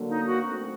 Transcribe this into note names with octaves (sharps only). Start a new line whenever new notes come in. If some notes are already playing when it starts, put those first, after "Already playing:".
Already playing: D3 F#3 A#3
D#4
F#4
A3 C4